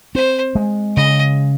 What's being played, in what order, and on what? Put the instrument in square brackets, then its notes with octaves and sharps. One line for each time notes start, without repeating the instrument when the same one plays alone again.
[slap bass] C4 [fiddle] C5
[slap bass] G#3
[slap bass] C#3 [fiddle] D#5